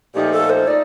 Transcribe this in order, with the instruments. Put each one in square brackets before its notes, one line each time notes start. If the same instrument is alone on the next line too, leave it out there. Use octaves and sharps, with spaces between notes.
[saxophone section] A#2 F3 A3 D#4 [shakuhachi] G4
[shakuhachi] A4
C5
[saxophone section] A3 D#4 [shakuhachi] D5